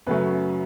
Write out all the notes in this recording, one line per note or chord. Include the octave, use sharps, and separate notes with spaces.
F#2 C#3 F#3 A3 C#4 B4